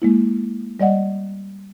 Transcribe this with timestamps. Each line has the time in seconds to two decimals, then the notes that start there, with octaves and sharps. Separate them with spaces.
0.02 G#3 A#3 E4
0.80 G3 D5 D#5 F#5